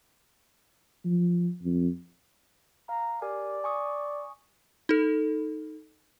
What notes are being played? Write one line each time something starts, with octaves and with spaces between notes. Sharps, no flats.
F3
F2
F5 A#5
G4 A#4 D5 G#5
G#5 C#6 D#6
D#4 A4